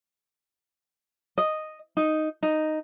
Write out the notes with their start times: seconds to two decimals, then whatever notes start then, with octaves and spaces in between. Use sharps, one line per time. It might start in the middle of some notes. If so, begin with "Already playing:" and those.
1.38 D#5
1.97 D#4
2.43 D#4